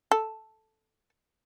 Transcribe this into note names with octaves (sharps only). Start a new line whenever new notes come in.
A4